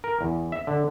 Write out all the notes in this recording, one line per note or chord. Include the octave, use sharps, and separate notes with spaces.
A#4
E2
E5
D3